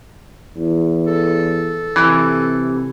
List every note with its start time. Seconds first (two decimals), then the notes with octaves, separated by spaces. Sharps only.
0.56 E2
1.07 A4
1.96 C3 E3